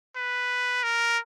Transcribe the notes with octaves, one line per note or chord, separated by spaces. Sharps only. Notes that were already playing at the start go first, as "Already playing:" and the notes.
B4
A#4